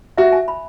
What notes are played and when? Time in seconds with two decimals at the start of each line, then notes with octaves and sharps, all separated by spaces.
0.18 F#4 E5
0.32 G#5
0.48 B5